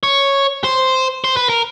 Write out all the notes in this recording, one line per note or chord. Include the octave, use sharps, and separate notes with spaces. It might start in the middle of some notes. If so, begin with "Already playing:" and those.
C#5
C5
C5
B4
A#4